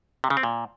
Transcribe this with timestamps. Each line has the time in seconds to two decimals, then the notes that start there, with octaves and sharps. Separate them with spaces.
0.24 C3
0.30 C#3
0.37 C4
0.43 A#2